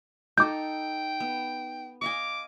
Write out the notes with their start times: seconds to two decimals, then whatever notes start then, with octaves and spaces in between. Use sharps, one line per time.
0.38 D#4 A4 G5 D6 G6
1.20 B3
2.02 D#5 F5 G#5 D6